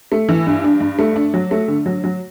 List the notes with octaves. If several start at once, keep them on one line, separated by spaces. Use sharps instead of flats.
A3
E3
G2
D4
G2
A3
D4
F#3
A3
D3
F#3
F#3